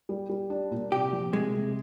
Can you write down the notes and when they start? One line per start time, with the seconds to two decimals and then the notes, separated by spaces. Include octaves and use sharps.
0.09 G3
0.29 G3
0.50 D4
0.71 A#2
0.92 C3 G4
1.13 F3
1.33 C3 G#3
1.54 C3